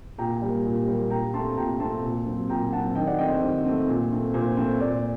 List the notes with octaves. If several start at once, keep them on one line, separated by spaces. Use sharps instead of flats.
A#2 G5 A#5
G3 A#3
A#2
G3 A#3
A#2 G5 A#5
A3 C4 A5 C6
A#2 G5 A#5
A3 C4 A5 C6
A#2
F#3 C4
A#2 G5 A#5
F#3 C4 F#5 A5
D#3 D#5 G5
D5 F#5
A3 C4 D#5 G5
C5
D#3
A3 C4
A#2
A3 C4
A#2 C5
A3 C4 C5
A#2 D5